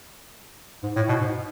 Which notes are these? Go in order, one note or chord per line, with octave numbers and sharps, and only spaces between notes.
G#2
A2
B2
G#2